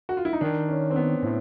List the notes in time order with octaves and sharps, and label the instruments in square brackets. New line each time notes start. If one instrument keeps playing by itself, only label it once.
[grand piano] F#4
F4
E4
D#4
[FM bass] D#3 [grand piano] D4
[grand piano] C#4
C4
B3
[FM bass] A2 [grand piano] C4